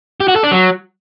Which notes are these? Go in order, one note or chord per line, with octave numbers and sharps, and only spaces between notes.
G4
F#4
A4
D4
F#3